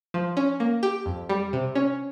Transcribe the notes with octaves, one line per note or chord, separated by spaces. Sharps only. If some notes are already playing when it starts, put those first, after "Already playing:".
F3
C#4
A#3
G4
F2
G3
C3
C#4